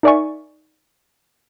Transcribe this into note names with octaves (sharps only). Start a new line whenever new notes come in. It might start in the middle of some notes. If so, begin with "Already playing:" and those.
D#4 A#4 D5 E5 G#5 C#6